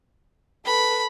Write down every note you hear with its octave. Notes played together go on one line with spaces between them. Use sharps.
A4 B4 B5